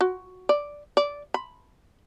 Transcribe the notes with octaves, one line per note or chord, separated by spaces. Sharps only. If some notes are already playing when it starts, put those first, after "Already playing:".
F#4
D5
D5
B5